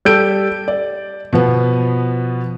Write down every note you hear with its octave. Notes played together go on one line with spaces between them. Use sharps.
G3 G4 A4 G6 D7
D5
B2 F3 B3